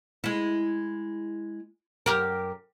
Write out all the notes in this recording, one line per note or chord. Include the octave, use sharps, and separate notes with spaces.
G#3 E4
F#2 G4 A#4